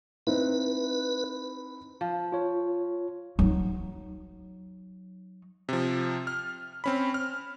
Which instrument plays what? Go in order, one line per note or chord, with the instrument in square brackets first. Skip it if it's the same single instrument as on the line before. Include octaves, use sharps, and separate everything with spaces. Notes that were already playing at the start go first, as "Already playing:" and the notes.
[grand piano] C4 D#4 E4 [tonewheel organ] B4
[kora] F3
[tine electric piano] F4 C#5
[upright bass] F#3 D#4
[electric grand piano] C3 F3
F6
C4 C#4 B5
F6